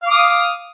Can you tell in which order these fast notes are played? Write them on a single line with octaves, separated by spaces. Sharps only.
F5 D6 D#6